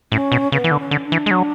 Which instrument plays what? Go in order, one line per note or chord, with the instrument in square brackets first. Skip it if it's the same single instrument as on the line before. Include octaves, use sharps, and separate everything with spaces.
[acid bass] A2 [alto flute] C#4
[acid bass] B2
[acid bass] C#3 [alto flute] B3
[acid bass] E3
D3
[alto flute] C#4
[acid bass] D3
[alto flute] D4
[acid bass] E3
G#3
F#3